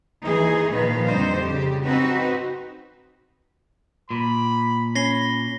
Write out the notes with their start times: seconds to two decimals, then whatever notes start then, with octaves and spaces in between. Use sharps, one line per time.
0.25 D#2 E3 D#4 G#4 C5
0.74 A#2 D#3 F3 B4 F5
1.07 F2 D3 G3 D#4 C5
1.43 C#3 G4
1.85 C4 D#4 F#4 B4
4.11 A#2 B5
4.95 C#4 B5 A#6 C7 G7